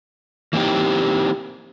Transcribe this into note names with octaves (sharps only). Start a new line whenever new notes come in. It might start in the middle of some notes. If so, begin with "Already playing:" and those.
E3 A#3 C4 D#4 G4